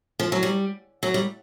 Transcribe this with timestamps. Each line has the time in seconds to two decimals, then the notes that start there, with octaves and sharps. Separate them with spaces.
0.19 F3
0.32 F#3
0.43 G3
1.03 F#3
1.14 G3